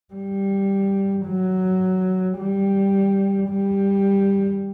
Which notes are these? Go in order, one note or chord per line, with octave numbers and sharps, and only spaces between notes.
G3
F#3
G3
G3